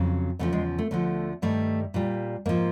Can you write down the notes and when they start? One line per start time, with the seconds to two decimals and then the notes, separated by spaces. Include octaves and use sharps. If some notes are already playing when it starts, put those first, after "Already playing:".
Already playing: F2 C#3 F#3
0.39 E2 C#3 F3 A3
0.53 G#3
0.78 A3
0.91 D2 D3 F3 A3
1.42 G2 D#3 G3 A3
1.94 A#2 G3
2.46 G#2 F3 A#3